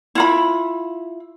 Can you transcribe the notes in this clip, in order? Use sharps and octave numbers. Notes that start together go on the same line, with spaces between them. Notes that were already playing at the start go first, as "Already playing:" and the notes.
E4 F4 B5